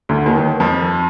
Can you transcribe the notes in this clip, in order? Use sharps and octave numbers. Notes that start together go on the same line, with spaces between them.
D2 D3
D#2 D#3
D#2 D#3
F2 F3